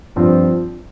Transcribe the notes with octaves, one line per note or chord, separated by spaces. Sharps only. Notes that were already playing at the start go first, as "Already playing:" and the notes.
G2 F3 C4 F4